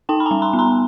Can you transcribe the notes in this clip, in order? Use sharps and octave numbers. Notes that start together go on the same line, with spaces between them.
D#4 G5 A5
B5
G3 G#5 A#5
A#5 C6
B3
A#5 C6